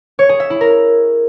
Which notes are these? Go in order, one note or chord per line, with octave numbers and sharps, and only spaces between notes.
C#5
G#4
E5
E4
A#4